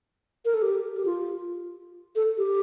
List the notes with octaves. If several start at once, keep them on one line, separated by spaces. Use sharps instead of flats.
A#4
A4
G4
G4
F4
A4
G4